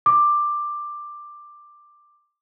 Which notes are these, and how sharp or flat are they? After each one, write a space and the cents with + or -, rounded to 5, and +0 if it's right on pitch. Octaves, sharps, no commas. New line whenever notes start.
D6 +10